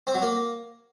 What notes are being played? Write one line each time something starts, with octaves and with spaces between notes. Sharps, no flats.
C4
F#3
A#3